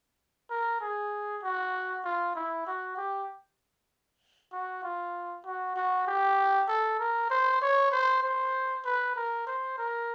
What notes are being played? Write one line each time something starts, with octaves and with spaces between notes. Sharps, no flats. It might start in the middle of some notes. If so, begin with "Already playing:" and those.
A#4
G#4
F#4
F4
E4
F#4
G4
F#4
F4
F#4
F#4
G4
A4
A#4
C5
C#5
C5
C5
B4
A#4
C5
A#4